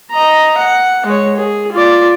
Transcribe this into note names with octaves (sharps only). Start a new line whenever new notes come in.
D#5 A#5
F#5
G#3 C#5
G#4
F4 D5